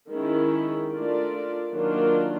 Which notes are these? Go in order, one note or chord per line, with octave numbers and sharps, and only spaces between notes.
D#3 G#3 C#4 E4
A3 D4 F4 A#4 D5
D#3 F#3 A#3 D4 F4